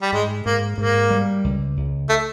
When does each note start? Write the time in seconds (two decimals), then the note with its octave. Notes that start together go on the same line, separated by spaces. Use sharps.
0.02 G3
0.12 G#2 G#3
0.46 G#2 A#3
0.78 G#2 A#3
1.10 G3
1.44 C#2
1.77 C#2
2.09 A3